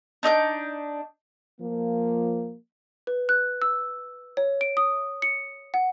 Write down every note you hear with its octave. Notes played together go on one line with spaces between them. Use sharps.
D4 D#4 D#6 G6
F3 A#3
B4
F#6
E6
C#5
D7
D#6
C#7
F#5